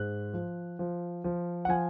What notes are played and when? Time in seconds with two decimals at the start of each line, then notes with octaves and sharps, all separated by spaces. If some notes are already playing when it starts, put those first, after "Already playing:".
Already playing: G#2 F#6
0.34 F3
0.79 F3
1.24 F3
1.65 F#5
1.69 F3 G#5